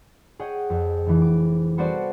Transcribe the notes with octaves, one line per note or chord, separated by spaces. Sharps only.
G#4 C#5 D#5 F#5 G5
F2
F1 E3
D6
G3 B3 F#4 A4 C5 D5